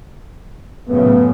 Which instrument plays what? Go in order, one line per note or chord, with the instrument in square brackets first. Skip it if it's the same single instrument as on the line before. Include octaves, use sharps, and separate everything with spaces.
[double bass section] F#2 A2 C#3 [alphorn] B3